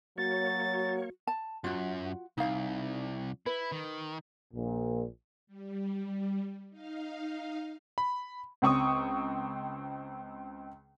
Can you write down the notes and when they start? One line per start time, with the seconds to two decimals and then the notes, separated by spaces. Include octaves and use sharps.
0.18 F#3 A#3 F#4 C#5 A6
1.27 A5
1.64 F#2 F4 F#4
2.38 C2 D#4 F5
3.46 E4 B4
3.72 D#3
4.54 A#1 A#2
5.47 G3
6.70 D#4 F5
7.98 B5
8.62 C#2 C4 C#6 D#6